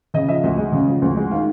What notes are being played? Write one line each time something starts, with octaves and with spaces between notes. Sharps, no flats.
C#3 D#5
F3 E5
D2 D#5
G#3
C#3
F3
D2
G#3
D#3 F5